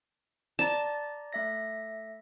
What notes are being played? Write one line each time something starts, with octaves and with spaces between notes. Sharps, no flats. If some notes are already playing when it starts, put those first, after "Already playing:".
D5 A5 A#5
A3 E5 A#6